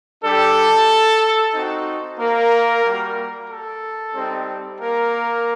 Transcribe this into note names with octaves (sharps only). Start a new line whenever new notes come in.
G3 D4 G4 A4
C4 D#4 F#4
A#3 A#4
G3 A#3 F#4
A4
G3 C4 D#4 G4
A#3 A#4